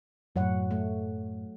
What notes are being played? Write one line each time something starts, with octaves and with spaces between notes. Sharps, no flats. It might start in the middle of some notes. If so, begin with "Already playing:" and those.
F#2 A2 F#3 C#5 F#5
A3